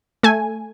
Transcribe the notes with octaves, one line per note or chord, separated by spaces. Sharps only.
A3 G#5